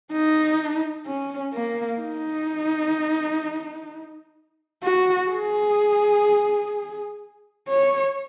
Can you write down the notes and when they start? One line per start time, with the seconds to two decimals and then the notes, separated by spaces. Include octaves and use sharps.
0.12 D#4
1.06 C#4
1.54 A#3
2.01 D#4
4.83 F#4
5.31 G#4
7.68 C#5